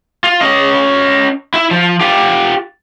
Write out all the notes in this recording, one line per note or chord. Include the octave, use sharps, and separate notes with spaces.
F4
C#4 D#5
E4 E5
F3
F4 G4